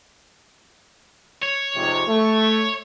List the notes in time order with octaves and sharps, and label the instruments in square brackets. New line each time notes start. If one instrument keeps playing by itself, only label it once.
[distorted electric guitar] C#5
[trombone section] F2 G#2 C3
A3